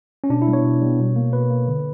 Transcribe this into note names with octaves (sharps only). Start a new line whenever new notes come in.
C#4
B2 D4
E4
G3 B3
C#5
B2
G3 B3
B2
A#3
B2 B4
A#3
D3